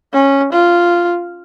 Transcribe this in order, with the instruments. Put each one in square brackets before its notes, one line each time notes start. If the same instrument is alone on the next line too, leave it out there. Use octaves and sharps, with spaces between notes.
[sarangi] C#4
F4